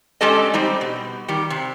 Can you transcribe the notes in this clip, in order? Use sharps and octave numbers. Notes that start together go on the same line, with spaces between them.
G#3 C#4 D4 G4 A4 D#5
G3 C4 D#4
B2
D#3 G3 G4
C3